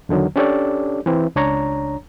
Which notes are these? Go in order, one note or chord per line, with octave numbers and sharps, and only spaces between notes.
E2 D3 D#3 F#3
C#4 D4 G4 A4 C#5 D5
E3 C4
C#2 D4 C#5 A#5